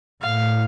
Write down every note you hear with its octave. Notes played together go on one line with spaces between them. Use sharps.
A2 F5